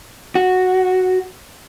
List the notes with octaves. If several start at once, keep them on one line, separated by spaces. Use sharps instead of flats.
F#4